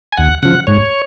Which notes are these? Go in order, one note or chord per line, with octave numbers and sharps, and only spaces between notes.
G#5
D#2 F#5
C#3 F3 F#5
G#2 C#5